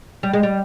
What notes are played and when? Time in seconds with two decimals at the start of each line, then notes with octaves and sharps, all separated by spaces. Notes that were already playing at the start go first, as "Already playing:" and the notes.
0.23 G3
0.33 G#3
0.43 G3